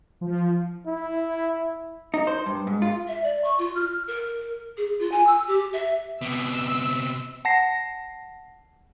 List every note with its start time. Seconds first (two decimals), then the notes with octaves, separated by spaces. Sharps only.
0.21 F3
0.87 E4
2.14 D#4
2.27 C5
2.46 G2
2.67 G#2
2.82 F4
3.08 E5
3.23 D5
3.44 C#6
3.58 F4
3.75 F6
4.07 A#4
4.77 G#4
4.99 F4
5.11 G#5
5.27 E6
5.47 G4
5.73 E5
6.22 C3 B3 E6
7.45 F#5 A5 A#6 C7